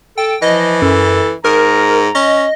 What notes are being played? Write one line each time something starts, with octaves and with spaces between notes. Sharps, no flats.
A4 G5
E3 F3 D#5
F#2 A4
G#2 A#4 A#5
C#4 D#5